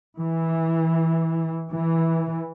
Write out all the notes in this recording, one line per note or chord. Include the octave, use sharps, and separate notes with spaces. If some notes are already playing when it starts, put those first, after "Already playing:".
E3
E3